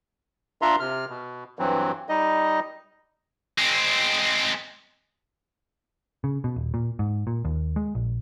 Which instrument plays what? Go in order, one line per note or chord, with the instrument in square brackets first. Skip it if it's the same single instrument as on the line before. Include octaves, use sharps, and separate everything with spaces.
[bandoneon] D4 F4 E5 A#5 C6
C3 F6
B2
G2 E3 F#3 C4
G3 D#4 D#5
[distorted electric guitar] G#3 C4
[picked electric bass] C#3
B2
D#1
A#2
G#2
A#2
D#2
G#3
A#1